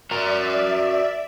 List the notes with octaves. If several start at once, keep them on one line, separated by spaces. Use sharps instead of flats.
F#4 A#4 D5 E5 A#5